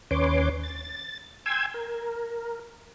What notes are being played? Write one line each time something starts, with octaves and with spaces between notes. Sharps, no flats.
D#2 C#4 B4 C#5 C6 D6
A6
G5 G#5 C6 E6 G#6
A#4